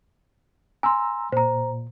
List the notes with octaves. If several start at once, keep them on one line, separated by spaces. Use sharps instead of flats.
G#5 A#5 C6 E6
A#2 C5 A#5